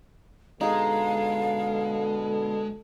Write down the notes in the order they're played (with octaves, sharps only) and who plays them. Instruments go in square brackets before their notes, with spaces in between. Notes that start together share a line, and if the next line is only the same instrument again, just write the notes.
[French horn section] B2 D3 A4 [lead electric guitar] G#3 [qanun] D#4 G#4 [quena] F5